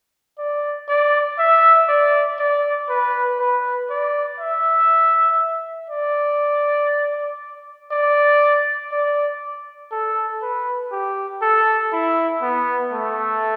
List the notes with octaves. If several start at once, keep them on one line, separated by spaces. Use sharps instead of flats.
D5
D5
E5
D5
D5
B4
B4
D5
E5
D5
D5
D5
A4
B4
G4
A4
E4
B3
A3